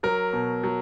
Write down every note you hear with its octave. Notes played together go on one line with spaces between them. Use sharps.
F#3 A#4
B2
F#3